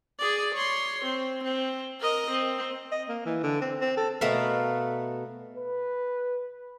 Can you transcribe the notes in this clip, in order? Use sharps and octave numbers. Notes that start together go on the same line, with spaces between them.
G#4 D5
C#5 C6
C4
C4
A#4 D#5
C4
D#5
A#3
E3
D3
C4
C4
A4
B2 A3 B3 A#4 E5 F5
B4